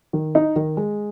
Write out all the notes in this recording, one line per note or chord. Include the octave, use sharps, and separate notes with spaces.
D#3
D#4
D#3
G#3